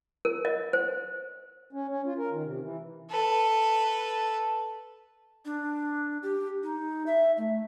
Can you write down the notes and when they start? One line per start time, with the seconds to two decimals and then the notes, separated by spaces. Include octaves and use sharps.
0.25 A#4
0.45 D#5
0.73 C5
1.73 C#4
1.89 C#4
2.06 F4
2.18 A#4
2.30 D#3
2.44 C3
2.61 E3
3.10 A4 B4
5.45 D4
6.23 G4
6.63 D#4
7.06 E5
7.37 A3